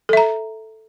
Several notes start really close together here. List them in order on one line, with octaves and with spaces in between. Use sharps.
A4 E5 A#5